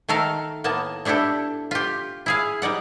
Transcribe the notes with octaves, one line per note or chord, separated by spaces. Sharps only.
D#3 A3 A4 A#4 F5
A2 A#3 B3 A5
A3 D4 E4 G4 A4
F4 G4
E4 G#4 F5
G3 D#4 D5 F#5